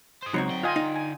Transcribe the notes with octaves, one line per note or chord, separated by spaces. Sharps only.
C5 D#5
C#2 F#3 C4 D#4 F#4
D3 G5
F4 D#5 G#5
D#4
G#5